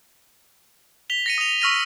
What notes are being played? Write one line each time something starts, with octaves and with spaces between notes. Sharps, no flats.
B6 F7 G7
A#6 C#7 D#7
D#6 F7
C#6 E6 F6 A#6 B6 D#7